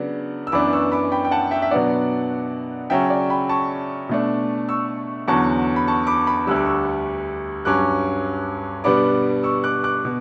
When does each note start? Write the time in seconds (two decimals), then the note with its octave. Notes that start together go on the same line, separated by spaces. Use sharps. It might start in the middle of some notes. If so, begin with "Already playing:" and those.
Already playing: C#3 F#3 B3 D4
0.47 E6
0.52 F#2 E3 B3 D4 B5 D6
0.72 C#6 E6
0.92 B5 D6
1.12 G5 B5
1.25 G5
1.31 F#5 A5
1.51 E5 G5
1.62 E5
1.71 B2 F#3 B3 D4 D5 F#5
2.90 C#3 F#3 C#4 E5 G5
3.10 D5
3.30 G5 B5
3.49 A5 C#6
4.09 B2 A3 D4
4.69 C#6 E6
5.28 E2 D3 F#3 C#4 A5 C#6
5.76 B5
5.87 A5 C#6
6.07 B5 D6
6.27 B5 D6
6.47 D2 D3 G3 E6
6.56 D6
6.65 C#6 E6
7.65 G2 F#3 C#4 D6 F#6
8.84 B2 G3 B3 D4 B5 D6
9.43 C#6 E6
9.64 D6 F#6
9.84 D6 F#6
10.05 B2